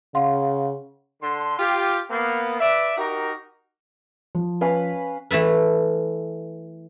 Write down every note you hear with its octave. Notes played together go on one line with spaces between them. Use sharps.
C#3 F5 F#5 C6
D3 C6
F4 G4
A#3 B3
B4 D5 E5
D#4 F#4 G4 A#4
F3
C#4 B4 F5
E3 A3 A4 B4